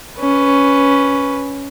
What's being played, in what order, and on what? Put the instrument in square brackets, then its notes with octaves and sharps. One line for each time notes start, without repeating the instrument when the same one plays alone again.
[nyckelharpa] C#4 B4